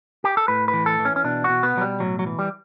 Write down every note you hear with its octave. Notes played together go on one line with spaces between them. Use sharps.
G4
A4
A2 B4
B4
E3
A4
E3
C#4
C#4
B2 D4
F#4
B2
B3
B2 F#3
G3
A2 F#3
F#3
E3
G3